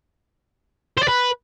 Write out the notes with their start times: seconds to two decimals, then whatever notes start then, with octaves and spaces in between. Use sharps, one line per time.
0.97 C5
1.03 D5
1.08 B4